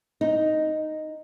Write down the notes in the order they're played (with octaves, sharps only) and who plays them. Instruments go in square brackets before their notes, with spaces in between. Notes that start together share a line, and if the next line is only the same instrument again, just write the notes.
[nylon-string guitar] D#4